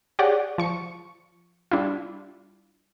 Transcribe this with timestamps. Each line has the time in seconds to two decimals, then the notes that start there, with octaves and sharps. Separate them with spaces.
0.19 G4 G#4 C#5 D5 F#5
0.58 F3 C#6 C#7
1.72 G3 D4 E4 F4